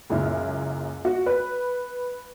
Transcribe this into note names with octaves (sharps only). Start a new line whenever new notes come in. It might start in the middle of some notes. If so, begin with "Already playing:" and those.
C#2 F#2 A#2 E4 F6
F#4
B4